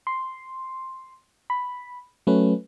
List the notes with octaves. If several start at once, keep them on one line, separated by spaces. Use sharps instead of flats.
C6
B5
F#3 A3 C#4 B4